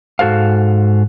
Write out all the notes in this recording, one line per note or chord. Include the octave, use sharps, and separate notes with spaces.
G#2 F#4 A4 C5 F5